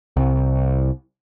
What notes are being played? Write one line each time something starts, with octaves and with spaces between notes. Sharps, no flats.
C2